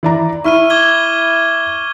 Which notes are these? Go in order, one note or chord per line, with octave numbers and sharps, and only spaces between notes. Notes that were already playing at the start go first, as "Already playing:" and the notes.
E3 D5 A#5
E4 E5 C#6 F6 D#7
D6 G#6 G7